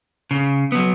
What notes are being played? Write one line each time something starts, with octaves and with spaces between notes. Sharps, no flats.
C#3
F#3 B3